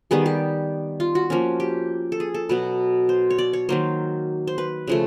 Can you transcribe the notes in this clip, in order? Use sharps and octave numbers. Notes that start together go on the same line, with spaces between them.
D#3 G3 B3 G#4
G4
F4
F#4
F3 A#3 C#4
G4
A4
G#4
A4
B2 F#3 B3 B4
C5
C#5
D5
C#5
D#3 F#3 A#3 C5
C5
B4
C#3 F3 A3